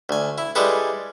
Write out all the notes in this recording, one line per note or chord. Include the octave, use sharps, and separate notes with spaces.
D2 G#5
E4
G3 G#3 E4 G#4 A4 B4